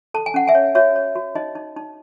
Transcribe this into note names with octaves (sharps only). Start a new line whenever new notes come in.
A4 A5
G#5
C#4 F#5
E5 G#5
C#5
F#4 C#5 E5
C#5
F#4
D#4 D#5
D#4
D#4